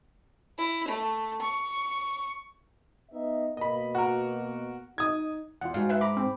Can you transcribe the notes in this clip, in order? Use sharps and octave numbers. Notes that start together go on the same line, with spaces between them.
E4
A3
C#6
B3 D#4 E5
B2 A#3 D#5 B5
F#4 A#4
D#4 D#6 G#6
E2 F4 F#5
G#2 F#4 F5
B4 E5 F#5
A#5 B5 D6
C4